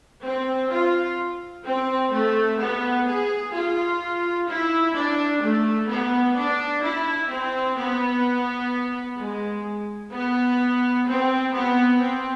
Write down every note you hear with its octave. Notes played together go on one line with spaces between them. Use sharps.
C4
F4
C4
A3
B3
G#4
F4
E4
D4
A3
B3
D4
E4
C4
B3
G#3
B3
C4
B3
C4